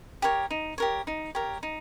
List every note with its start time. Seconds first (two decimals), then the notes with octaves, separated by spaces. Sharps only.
0.22 G4 A#4 C#5
0.51 D#4
0.78 G4 A#4 C#5
1.07 D#4
1.35 G4 A#4 C#5
1.63 D#4